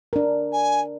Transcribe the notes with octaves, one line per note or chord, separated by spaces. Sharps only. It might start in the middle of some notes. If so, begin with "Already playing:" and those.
D4 A#4
G#5